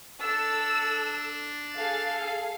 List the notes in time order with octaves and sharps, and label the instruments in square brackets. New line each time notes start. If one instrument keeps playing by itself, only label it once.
[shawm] D4 [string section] A4 E6
[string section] G#4 A4 F5